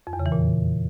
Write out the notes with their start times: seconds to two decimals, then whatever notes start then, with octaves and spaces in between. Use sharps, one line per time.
0.07 F2
0.13 E2
0.19 C#3
0.26 E3
0.32 A#2